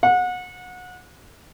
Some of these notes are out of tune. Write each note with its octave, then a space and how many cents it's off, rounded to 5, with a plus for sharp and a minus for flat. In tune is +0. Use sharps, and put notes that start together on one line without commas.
F#5 -30